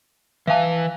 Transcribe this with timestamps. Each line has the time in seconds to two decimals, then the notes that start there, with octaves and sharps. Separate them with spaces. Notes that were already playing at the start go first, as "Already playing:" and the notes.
0.47 E3 E5 F5 G#5 A5